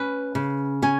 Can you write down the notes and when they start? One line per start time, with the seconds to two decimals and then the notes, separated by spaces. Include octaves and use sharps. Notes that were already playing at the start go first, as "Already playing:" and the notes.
Already playing: C#4 B4
0.35 C#3
0.82 C#4 G#5